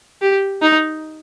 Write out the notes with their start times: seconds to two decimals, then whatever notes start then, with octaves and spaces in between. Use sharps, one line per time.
0.22 G4
0.62 D#4